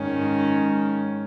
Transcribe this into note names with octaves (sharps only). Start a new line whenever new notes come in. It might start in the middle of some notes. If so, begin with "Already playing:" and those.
Already playing: G#2 D#3 C#4